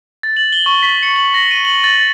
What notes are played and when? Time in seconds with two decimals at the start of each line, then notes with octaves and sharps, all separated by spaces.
0.23 A6
0.37 F#7
0.53 G7
0.66 C#6
0.83 B6
1.03 C#7
1.16 F#7
1.34 A#6
1.51 D#7
1.65 F#7
1.84 A6